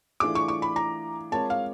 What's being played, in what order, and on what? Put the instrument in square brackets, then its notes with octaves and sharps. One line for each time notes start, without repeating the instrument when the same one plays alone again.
[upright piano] E3 A3 D4 F4 G#4 [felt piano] D6
[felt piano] C#6
C#6
B5
A#5
[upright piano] G#3 C4 F4 A#4 C#5 [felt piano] A5
[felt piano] F5